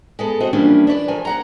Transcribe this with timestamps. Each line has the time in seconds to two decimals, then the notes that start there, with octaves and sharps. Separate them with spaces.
0.19 G#3 B3 A4
0.40 C4 F#4 D#5
0.53 E3 F3 G3 A#3 C#4 D4
0.87 D4 B4 C#5 D5
1.08 F3 A3 A#4 G#5
1.25 A#3 F#5 A#5